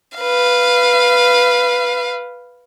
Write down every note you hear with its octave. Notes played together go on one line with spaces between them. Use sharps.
B4 F5